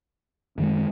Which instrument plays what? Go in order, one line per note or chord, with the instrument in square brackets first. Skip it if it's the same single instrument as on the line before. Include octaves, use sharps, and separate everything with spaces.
[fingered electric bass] F#2 D#3 G#3